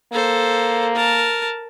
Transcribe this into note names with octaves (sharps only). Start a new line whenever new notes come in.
A#3 A4 C5
A#4 A5